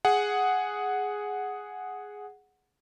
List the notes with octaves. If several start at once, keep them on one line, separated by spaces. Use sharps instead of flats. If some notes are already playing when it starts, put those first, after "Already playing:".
G#4 F#5